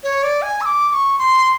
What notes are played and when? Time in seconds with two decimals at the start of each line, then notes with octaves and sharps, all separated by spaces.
0.04 C#5
0.23 D5
0.42 G#5
0.61 E6
0.66 D6
0.90 D6
0.93 C#6
1.19 C6